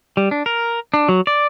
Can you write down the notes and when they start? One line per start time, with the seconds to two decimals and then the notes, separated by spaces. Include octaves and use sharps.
0.17 G3
0.31 D4
0.46 A#4
0.94 D4
1.09 F#3
1.27 D5